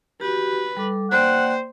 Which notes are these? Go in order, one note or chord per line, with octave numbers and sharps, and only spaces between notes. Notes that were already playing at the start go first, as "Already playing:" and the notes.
F#4 G4 B4
G3 A4 D6
A#3 C5 D5 F#5 G5